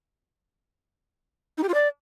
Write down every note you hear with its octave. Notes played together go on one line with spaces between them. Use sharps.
D#4
G4
F4
D5